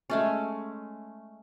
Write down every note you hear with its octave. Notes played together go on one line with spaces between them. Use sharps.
G#3 A3 C#4